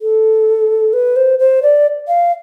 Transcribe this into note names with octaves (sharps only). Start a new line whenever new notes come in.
A4
B4
C5
C5
D5
F5